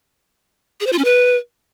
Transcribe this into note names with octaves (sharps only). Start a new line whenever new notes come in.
G#4
C5
F4
C#4
B4